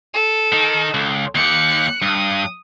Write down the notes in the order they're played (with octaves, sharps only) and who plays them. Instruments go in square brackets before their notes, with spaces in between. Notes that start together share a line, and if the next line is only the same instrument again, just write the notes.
[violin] A4
[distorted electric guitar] D#3 D#4
C#2
[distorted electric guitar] D#2 G4 [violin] F#6 C#7
[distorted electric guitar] G2 [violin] D#6